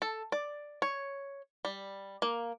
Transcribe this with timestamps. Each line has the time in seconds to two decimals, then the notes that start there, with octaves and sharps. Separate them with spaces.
0.02 A4
0.32 D5
0.82 C#5
1.65 G3
2.22 A#3